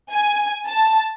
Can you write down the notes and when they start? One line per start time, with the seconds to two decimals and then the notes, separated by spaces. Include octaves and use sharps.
0.10 G#5
0.66 A5